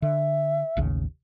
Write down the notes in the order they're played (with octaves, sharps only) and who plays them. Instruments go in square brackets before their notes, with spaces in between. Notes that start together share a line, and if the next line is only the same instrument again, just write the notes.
[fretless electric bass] D3 [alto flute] E5
[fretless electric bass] A1 D#2 C#3